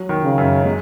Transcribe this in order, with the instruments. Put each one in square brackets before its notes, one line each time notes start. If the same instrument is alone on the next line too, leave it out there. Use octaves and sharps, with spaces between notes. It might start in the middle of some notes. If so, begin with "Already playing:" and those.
Already playing: [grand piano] F#3
D#3
[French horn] C#3
[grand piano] F#2
G#3